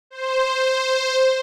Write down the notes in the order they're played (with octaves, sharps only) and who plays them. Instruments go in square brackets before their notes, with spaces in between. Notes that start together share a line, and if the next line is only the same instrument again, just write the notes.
[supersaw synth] C5